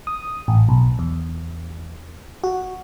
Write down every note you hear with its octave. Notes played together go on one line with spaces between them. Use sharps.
D#6
A1
B1
E2
F#4